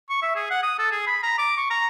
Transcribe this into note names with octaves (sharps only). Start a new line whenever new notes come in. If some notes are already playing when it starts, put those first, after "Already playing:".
C#6
E5
G#4
F#5
D#6
A4
G#4
B5
A#5
D6
C#6
A#5